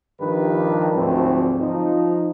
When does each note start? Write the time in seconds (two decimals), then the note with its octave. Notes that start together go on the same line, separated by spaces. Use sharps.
0.20 G2 D#3 F3 G3 D4 B4
0.95 D2 G#2 F3 F#3 C4
1.60 F3 D#4